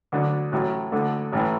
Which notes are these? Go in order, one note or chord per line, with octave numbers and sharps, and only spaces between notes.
D2 D3 F#3 D4
A1 A2 F#3
D2 D3 A3
A1 A2 E3